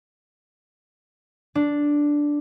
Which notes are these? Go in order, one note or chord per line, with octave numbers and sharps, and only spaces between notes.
D4